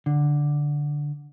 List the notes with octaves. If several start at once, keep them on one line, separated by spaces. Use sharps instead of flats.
D3